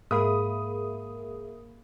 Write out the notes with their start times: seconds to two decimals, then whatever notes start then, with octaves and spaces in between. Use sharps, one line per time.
0.11 G#2 A#3 G#4 A#4 E5 F5 B5 D#6